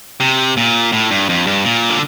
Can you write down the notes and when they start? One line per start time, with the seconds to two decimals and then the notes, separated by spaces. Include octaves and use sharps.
0.20 C3
0.57 A#2
0.92 A2
1.11 G2
1.29 F2
1.47 G2
1.65 A#2
1.90 D3